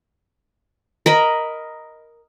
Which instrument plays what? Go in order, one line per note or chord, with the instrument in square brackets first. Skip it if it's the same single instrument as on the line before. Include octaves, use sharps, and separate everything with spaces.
[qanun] A#4 D#5 B5